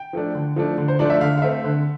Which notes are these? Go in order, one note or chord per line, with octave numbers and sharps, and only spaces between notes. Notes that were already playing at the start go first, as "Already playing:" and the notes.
Already playing: G5
F3 A3 D4
D3
F3 A3 D4
D3
C5
F3 A3 D4 D5
E5
D3 F5
F5
A3 C4 E5
D3